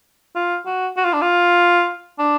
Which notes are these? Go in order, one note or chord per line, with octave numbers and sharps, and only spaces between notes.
F4
F#4
F#4
F4
D4
F4
D4